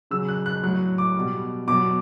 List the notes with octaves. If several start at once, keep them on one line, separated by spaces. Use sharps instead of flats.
C#3 F#3 E6
F#6
F#6
A2 F#3 F#6
D6
B2 G3
B2 F#3 D6